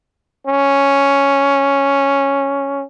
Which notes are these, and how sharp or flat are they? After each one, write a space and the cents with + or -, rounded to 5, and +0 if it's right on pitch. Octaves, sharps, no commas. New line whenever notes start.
C#4 +0